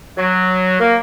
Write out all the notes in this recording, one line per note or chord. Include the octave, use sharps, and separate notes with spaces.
F#3
A#3